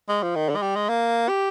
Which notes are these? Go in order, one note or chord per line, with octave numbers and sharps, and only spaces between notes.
G#3
F3
D#3
D3
G#3
G3
G#3
A#3
G4